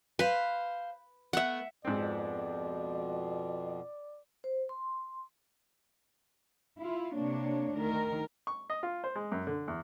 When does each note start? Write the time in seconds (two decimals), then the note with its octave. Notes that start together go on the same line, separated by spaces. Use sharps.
0.19 B4 C5 F5
1.33 A3 B3 E5 F#5
1.85 F2 G#2 B2 C4 D5
4.44 C5
4.69 C6
6.80 E4 F4
7.15 C3 A#3 D4 C#5
7.75 D2 D#3 A#4
8.47 C#6
8.70 D#5
8.83 F4
9.04 C5
9.15 G#3
9.32 F#2
9.47 D3
9.68 E2